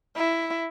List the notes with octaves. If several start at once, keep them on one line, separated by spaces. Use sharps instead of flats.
E4